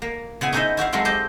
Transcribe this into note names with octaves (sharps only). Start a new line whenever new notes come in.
A#3
C#3 B3 E4 G#5
C#4 D#4 E4 C5 D#5 E5
E4 F#4 E5 F5
F#3 G#3 A3 C4 F4
C4 G4 C5 D#5